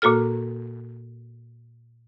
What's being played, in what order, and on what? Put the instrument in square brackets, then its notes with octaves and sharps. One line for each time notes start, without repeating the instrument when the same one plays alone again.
[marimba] A#2 A#3 F#4 A4 F6